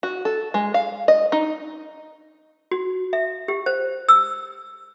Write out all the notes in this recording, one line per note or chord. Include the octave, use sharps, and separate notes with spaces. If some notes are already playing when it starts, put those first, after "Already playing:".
F#4
A4
G#3
F5
D#5
D#4
F#4
E5
G4
C5
E6